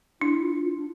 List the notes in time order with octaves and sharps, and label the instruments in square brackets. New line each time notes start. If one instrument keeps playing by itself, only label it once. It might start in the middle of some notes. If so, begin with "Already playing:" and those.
[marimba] D4 [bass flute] E4
[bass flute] F4
F4
D4